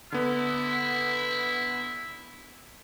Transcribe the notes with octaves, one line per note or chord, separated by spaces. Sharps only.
D3 B3 E4